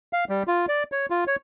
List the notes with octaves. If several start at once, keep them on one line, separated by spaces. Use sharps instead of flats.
F5
G3
F4
D5
C#5
F4
C#5